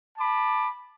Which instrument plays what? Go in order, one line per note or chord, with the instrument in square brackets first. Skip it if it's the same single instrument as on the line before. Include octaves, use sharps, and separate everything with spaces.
[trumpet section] A5 B5 D6